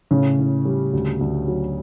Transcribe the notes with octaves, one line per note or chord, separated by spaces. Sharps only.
A2 C#3 C#4
A2
G3
D2
D2
F#3